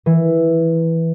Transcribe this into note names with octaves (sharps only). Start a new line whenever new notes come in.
E3